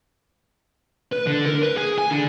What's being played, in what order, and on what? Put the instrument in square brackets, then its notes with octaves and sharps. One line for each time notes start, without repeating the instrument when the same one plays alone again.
[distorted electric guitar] B4
D3
A#4
B4
G#4
G#5
D3